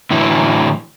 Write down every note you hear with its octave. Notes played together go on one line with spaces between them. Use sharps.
A2 D3 E3 F#3 E4